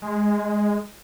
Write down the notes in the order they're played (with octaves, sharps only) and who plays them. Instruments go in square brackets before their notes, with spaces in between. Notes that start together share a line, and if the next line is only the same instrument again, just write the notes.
[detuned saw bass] G#3